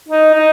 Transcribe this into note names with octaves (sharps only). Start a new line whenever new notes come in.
D#4
D#4